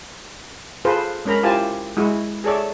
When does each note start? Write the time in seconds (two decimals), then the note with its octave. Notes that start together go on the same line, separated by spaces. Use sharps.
0.85 F4 G#4 A4 B4 C5
1.25 G#3 C#4 A#4 A#5 B5
1.43 E4 F4 G4 C5 G#5 A5
1.97 G#3 E4 F#4
2.44 G#4 A4 C#5 D5 E5